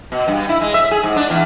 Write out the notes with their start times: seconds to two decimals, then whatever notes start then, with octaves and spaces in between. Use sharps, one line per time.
0.12 B2
0.28 G2
0.49 E4
0.61 G#3
0.74 E5
0.91 G#4
1.03 G#2
1.16 D4
1.30 E2